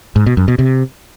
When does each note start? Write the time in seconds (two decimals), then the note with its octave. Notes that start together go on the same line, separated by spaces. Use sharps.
0.16 G#2
0.26 B2
0.37 F#2
0.48 B2
0.59 C3